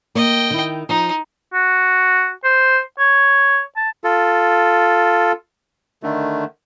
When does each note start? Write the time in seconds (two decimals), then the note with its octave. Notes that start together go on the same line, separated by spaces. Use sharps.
0.15 A#3 D#5 G5
0.51 D#3 E4
0.89 F3 D#4
1.53 F#4
2.44 C5
2.99 C#5
3.76 A5
4.04 F4 A4
6.03 D3 D#3 A3